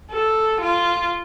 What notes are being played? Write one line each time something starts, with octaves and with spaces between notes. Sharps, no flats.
A4
F4